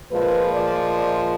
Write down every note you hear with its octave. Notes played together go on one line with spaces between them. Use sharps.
A#2 F3 G#3 B4
D5